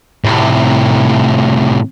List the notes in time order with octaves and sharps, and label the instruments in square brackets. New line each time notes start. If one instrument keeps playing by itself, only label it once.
[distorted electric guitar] A2 C3